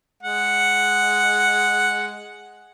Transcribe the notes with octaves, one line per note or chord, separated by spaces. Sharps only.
G#3 F#5